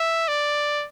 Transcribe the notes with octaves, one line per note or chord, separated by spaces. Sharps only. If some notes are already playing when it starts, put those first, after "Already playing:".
Already playing: E5
D5